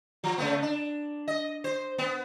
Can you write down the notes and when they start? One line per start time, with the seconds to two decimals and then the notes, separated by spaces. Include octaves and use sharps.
0.24 F3
0.38 C#3 A3 B3
0.62 D4
1.28 D#5
1.64 C5
1.98 B3